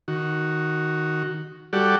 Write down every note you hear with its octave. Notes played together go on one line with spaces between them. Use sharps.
D#3 F#4
G3 F#4 G4 A4 D5 F#5